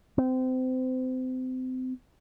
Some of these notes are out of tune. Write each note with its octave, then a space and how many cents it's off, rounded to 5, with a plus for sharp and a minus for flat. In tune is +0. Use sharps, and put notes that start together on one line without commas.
C4 -30